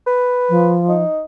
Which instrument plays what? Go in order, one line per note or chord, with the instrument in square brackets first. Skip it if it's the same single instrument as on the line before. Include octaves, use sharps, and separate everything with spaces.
[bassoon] B4
[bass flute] F3
[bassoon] D#4